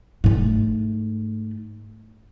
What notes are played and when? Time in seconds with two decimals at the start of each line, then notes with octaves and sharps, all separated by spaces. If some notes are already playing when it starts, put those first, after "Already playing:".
0.24 G#2 A3